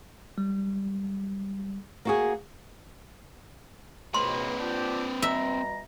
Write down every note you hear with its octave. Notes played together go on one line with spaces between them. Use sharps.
G3
A#3 F#4 G#4
C#2 B2 A#3 C4 B4 C6
D4 F4 G4
B2 G3 E5 A#5